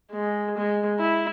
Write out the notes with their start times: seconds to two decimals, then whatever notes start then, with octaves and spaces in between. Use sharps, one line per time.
0.11 G#3
0.57 G#3
0.99 E4